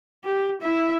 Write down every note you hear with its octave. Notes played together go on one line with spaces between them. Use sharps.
G4
E4 E5